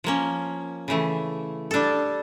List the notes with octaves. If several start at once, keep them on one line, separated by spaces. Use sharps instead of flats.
F3 A#3 C#4
C#3 E3 A3
G3 D4 A4